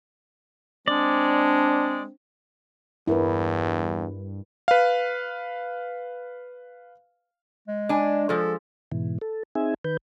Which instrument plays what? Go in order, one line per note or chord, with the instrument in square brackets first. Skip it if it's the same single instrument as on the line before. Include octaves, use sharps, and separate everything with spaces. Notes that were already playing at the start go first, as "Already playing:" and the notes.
[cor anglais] G#3 [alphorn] C4 [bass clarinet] D4 [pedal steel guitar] D5
[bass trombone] E2 [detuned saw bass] G2 [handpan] E4 A#4 B4
[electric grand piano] B4 F5
[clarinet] G#3
[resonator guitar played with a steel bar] D4 G#5
[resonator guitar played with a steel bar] F3 G#3 [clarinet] A4
[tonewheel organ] G#2 B2 E3
A4
C4 D#4 G#4 E5 G#5
D#3 B4 G6